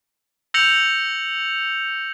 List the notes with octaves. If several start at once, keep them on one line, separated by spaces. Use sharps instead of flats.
E6 G6 A#6 C#7 F7 F#7